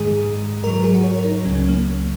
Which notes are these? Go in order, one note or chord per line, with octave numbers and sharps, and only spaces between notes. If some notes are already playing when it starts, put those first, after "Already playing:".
Already playing: G#2 D#3 G#3 G#4
G#2 F#3 A#4
A#4
G#4
F#4
C#5
A#4
D#4
C#2 C#3 F#3 C#4
C#4
A#3